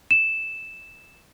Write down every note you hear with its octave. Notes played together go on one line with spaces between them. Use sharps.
E7